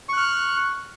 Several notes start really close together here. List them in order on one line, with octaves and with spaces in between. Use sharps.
C#6 F#6 F6